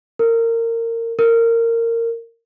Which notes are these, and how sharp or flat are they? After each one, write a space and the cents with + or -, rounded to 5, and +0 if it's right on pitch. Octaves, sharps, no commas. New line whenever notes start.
A#4 -25
A#4 -20